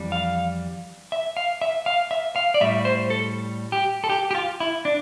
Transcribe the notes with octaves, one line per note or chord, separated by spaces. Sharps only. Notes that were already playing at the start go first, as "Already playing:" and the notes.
Already playing: F2 E3 G3
F5
E5
F5
E5
F5
E5
F5
D5
A2 G3 E5
C5
A4
G4
A4
G4
G4
F4
E4
D4